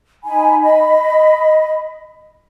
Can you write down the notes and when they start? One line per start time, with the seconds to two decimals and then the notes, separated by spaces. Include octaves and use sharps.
0.24 D#4 G#5 B5
0.62 D#5 B5